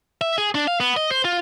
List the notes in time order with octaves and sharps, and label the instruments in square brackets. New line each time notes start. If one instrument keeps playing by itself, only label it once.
[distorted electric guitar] E5
G#4
D4
F5
B3
D#5
C5
F4